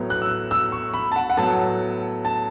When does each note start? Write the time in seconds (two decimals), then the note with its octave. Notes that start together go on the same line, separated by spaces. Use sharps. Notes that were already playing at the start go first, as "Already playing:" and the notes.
Already playing: A2 F#3 B3
0.10 F#6
0.22 E6
0.51 E6
0.72 C#6
0.94 B5
1.12 A5
1.16 F#5
1.30 F#5
1.37 A2 F#3 B3 A5
2.25 A5